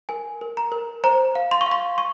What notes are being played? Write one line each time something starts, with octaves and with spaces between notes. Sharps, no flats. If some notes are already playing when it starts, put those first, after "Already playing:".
A#4 G#5
A#4
A#5
A#4
C5 A#5
F5
C6
C#6
F5
C6
C#6